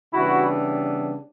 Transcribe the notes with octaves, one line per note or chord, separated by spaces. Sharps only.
C#3 E3 G3 B3 D4 E4 F#4